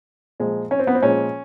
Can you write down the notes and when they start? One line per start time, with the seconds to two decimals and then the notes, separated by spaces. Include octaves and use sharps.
0.40 A#2 F3 G#3
0.71 C#4
0.79 C4
0.87 B3
0.95 C4
1.03 A#2 F3 G#3 C#4